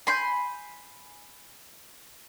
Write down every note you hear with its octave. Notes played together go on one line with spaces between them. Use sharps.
G#5 B5 C6 G6